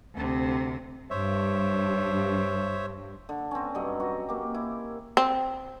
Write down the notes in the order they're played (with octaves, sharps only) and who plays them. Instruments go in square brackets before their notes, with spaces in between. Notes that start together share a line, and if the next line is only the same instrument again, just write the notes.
[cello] D2 C3
[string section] G2 [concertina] C5 C#5 E5
[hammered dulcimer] D3
C4 C#4
G2 F#3 G3 D#5
F#4
A#3 G4
E4
[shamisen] C4